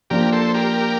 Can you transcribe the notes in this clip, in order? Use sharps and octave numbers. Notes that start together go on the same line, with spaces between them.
F3 A#3 D4 G4 A#4
A4 C5
G4 A#4